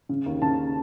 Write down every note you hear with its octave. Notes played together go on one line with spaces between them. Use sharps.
C#3
D#2
C#3 A5